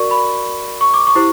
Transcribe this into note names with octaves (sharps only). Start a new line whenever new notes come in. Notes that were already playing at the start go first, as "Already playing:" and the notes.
Already playing: F#4 A#4 D5 C#6
B5
C#6
D6
C#6
E4 G4 C5